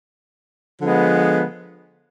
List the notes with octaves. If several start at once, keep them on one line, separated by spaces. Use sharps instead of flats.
D3 F3 G#3 B3